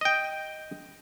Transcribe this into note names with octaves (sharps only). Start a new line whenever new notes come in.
D#5 G5